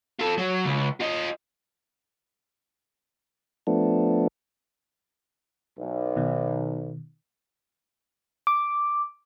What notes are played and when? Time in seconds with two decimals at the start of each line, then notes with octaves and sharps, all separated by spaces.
0.19 F4 A4
0.38 F#3
0.65 C#2
1.01 F4 D#5
3.67 F3 A3 B3 D4
5.78 B1
6.16 B2 D#3
8.47 D6